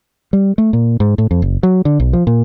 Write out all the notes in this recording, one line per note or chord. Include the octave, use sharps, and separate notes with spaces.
G3
A3
A#2
G#2
A2
F2
F#1
F#3
D3
B1
F3
A#2